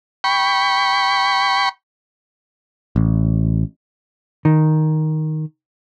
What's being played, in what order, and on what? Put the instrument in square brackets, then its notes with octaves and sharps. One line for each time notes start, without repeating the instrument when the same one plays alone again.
[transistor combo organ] G5 B5 C#6
[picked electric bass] A1
[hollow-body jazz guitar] D#3